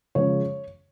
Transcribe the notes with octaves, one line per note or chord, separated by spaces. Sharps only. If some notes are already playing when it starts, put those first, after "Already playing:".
C#3 F3 G#3 C#5